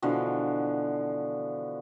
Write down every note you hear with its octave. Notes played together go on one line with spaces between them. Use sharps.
B2 D3 E3 F3